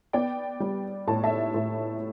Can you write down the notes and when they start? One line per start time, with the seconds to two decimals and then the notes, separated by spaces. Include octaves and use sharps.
0.13 B3 D5 G5
0.60 G3
1.08 A2 A5
1.23 E5 A5
1.54 A2